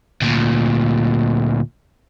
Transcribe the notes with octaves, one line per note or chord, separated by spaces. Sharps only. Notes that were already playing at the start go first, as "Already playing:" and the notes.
D2 A#2